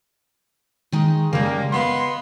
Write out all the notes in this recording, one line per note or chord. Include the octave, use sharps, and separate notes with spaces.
D#3 G#3 D#4
C#3 G3 G#3 A#3
B3 B4 D#5 F5 C6